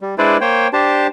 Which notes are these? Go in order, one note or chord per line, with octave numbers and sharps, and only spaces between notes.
G3
G#3 D4 E4 B4 C5 D5
A#3 C5 C#5 G5
D4 G4 C5 A5